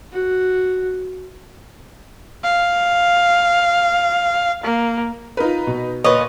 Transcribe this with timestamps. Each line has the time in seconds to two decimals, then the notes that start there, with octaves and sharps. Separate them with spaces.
0.13 F#4
2.43 F5
4.64 A#3
5.37 D#4 F4 A#4 B4
5.67 B2
6.04 A#2 B4 C#5 D#5